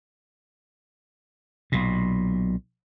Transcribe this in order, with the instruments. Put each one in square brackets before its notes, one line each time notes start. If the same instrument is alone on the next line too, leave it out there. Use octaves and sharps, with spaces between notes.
[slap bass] B1 A#2